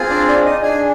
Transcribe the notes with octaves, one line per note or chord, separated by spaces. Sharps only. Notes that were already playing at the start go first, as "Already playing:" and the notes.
Already playing: C4 F4 G#4
D4 D5
D4 D5
D#4 D#5
D4 G#4 G#5